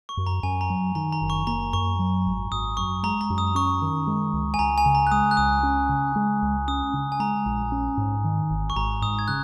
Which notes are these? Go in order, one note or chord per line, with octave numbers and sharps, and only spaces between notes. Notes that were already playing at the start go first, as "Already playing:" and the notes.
C#6
F#2
A#5
F#2 G#5
A#5
F#3
D#3 A#5
A#5
F#1
C#6
A#3 A#5
F#2 C#6
F#3
G#1
G#1 D#6
F#2 C#6
G#3 A#5
A#5
F#2
D#6
C#4 C#6
D#3
G#3
C#2
G#5
C#2 A#5
G#5
C#3
A#5
F#6
G#3 D#6
F#6
C#2 D#6
C#4
C#3
G#3
C#2
C#4 D#6
C#3
G#5
G#3 A#5
A#1
C#4
G#2
D#3
G#1
C#6
G#1 A#5
G#2 D#6
G#6
C#3 F#6